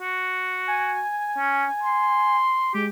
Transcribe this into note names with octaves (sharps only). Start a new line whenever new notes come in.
F#4
G#5
C#4
C6
G#3 G4